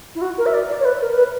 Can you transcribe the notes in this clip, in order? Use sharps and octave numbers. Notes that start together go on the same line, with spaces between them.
E4
F#4
A#4
E5
D5
D5
C#5
B4
A#4
B4